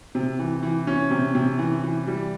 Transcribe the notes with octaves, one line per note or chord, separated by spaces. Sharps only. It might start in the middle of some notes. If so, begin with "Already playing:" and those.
C3
E3
E3
C#4
C3
C3
E3
E3
G3